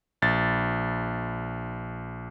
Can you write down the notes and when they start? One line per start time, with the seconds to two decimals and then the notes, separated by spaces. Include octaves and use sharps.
0.22 A#1 A6